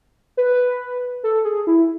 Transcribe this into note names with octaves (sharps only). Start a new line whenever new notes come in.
B4
A4
G#4
E4